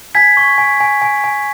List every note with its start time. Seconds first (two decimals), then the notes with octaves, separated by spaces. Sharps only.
0.15 G#5 G#6 B6
0.37 C#6
0.58 G#5
0.80 G#5
1.02 G#5
1.24 G#5